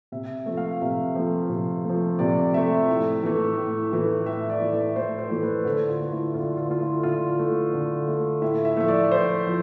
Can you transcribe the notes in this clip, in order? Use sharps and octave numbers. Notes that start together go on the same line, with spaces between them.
C3 E5
F3 A3
F5
C3 E5
F3 A3
C3
F3 A3
C3 D5
F3 A3 E5
A2
E3 A3
A2
E3 A3
A2 E5
D5
E3 A3
E5
A2 C5
C5
E3 A3
B4
D3 A4
F4
A3
E4
D3 F4
F4
A3 F4
E4
D3 F4
A3
D3
A3
A2 E5
E5
F3 A3 E5
D5
A2 C5
F3